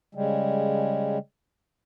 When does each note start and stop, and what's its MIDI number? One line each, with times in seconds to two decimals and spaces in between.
0.15 1.18 49
0.15 1.18 55
0.15 1.18 56